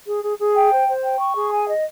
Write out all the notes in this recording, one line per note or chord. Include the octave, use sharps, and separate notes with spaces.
G#4
G#4
G#4
G5
C5
C5
G5
C#6
G#4
G#5
D#5